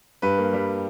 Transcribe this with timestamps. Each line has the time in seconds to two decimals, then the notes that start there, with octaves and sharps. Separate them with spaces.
0.22 G2 B4
0.38 A#3
0.53 G3